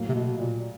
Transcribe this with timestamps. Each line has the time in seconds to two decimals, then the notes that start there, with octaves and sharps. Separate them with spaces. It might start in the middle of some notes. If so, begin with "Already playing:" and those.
Already playing: A2 F#3 A#3
0.09 C3
0.15 B2
0.38 A#2